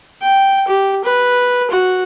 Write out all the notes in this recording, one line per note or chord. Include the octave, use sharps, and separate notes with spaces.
G5
G4
B4
F#4